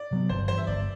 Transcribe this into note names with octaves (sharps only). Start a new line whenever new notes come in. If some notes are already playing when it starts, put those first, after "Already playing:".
Already playing: D5
C3 F#3 B3
G1 C5
G2 E3 C5
E5
G1 D5